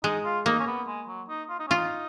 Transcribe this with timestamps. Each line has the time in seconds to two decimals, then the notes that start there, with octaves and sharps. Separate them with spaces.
0.04 G#3 D#4
0.25 F4
0.46 A#3 D#4
0.60 C#4
0.67 B3
0.87 G#3
1.08 F#3
1.29 D#4
1.50 F4
1.60 D#4
1.68 C#4 F4
1.77 D#4